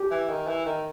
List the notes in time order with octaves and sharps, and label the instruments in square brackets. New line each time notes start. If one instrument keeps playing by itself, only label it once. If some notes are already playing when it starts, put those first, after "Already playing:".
Already playing: [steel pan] G4
[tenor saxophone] E3
D#3
E3
D#3